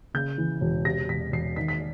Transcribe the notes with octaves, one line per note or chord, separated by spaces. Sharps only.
C#3 G6
E3
E1
C3 A#6
E1 B6
E1 C7
D#3 B6
B6